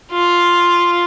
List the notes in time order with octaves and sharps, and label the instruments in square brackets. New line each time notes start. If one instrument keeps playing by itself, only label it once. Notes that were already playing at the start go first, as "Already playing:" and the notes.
[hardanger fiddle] F4